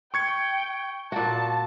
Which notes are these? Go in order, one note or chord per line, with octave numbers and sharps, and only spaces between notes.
G5 C#6 G#6 C#7
A#2 F#4 A5